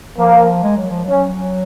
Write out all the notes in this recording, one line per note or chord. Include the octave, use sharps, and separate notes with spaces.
F3 A#3
G#3
F#3
F3
F#3 C#4